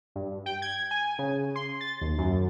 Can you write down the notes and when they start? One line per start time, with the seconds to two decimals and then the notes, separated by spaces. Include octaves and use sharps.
0.16 G2
0.46 G5
0.62 G#6
0.91 G#5
1.19 C#3
1.55 C6
1.81 A6
2.01 D#2
2.18 F#2